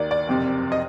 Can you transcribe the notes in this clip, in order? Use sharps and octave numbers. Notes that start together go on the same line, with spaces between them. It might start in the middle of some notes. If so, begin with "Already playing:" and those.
Already playing: D#2 D#3 D5
D5
F#1 F2 C3
D#5